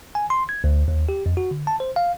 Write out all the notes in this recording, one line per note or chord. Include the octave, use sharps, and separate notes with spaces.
G#5
C6
G#6
D2
D#2
G4
F2
F#4
D3
A5
C5
F5